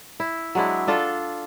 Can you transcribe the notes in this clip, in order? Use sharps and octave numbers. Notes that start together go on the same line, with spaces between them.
E4
F#3 G#3 D4 E4
D4 F4 A4